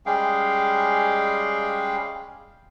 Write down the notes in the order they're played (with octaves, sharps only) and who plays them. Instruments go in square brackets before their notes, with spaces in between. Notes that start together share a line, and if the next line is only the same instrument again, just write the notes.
[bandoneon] G3 G#3 C#4 G#4 F5 G5